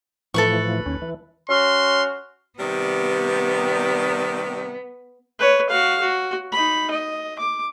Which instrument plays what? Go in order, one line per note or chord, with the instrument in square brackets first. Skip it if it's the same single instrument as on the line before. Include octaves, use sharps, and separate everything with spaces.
[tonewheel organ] A2 E3 F3 [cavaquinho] A4 B4 C#6
[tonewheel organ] D#2 C#4
E3
[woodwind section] C#4 F#4 F6 [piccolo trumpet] C6
[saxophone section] C3 D#3 G3 [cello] B3
[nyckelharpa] B4 C#5
F#4 F5
F#4
D#4 B5
D#5
D6